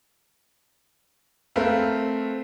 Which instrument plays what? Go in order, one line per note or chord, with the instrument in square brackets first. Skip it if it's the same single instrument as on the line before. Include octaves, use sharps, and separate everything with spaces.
[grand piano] A3 C4 A#4 B4 F5